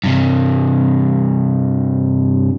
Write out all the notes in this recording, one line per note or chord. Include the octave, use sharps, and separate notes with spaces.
G2 C3